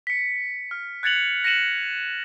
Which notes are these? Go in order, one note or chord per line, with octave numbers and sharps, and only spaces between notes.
B6 C#7
F6
F#6 G#6 A6 C#7 F7 F#7
C#7
A#6 C#7 D#7 E7 F#7